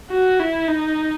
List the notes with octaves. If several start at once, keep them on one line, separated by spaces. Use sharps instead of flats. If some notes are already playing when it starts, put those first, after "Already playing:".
F#4
E4
D#4